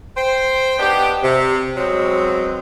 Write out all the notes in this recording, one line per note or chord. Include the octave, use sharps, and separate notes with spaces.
C5 G5
B3 D4 D#4 G4
C3
B2 F#3 G#3 C4